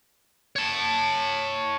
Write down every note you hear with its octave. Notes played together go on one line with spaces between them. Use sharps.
C#5 A5